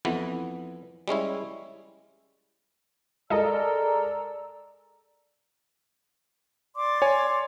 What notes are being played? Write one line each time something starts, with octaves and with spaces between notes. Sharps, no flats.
F2 E3 B3
G3 G#3 C#4 E4
G#3 A4 A#4 D5 D#5 A#5 E6
D5 C6 D6
C#5 G#5